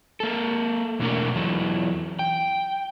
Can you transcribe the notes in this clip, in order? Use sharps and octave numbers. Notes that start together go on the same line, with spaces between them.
A#3 A4
E2 B2 A3 D4 F#4 A#4
E2 E3 F#3
G5